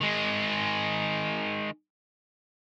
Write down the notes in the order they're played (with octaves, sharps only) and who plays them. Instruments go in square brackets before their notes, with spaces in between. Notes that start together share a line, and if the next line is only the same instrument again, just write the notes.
[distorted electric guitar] D#3 G#3